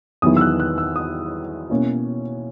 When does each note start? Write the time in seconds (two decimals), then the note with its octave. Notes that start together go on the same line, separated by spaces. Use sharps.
0.22 E2 D#3 F#3 B3 E4 D#6
0.37 E6
0.41 F#6
0.60 F#6
0.78 E6
0.96 D#6
1.70 B2 A#3 C#4 E4